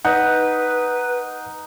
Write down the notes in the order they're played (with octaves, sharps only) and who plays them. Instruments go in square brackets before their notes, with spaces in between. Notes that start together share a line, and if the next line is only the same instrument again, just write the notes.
[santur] D#4 [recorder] B4 [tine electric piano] F#5